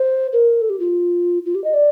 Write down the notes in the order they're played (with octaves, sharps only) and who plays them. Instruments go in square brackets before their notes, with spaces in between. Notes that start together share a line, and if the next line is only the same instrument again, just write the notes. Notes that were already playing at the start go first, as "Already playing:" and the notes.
Already playing: [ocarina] C5
A#4
A4
G4
F4
F4
G4
D#5
D5